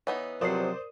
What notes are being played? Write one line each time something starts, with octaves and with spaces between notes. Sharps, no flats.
E3 B3 D#4 C#5
C3 F3 F#3 A#4 C5 D5 D#6 C7